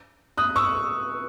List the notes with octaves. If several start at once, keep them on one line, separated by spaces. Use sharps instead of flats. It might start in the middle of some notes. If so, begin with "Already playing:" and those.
D#6 F#6
C#6 E6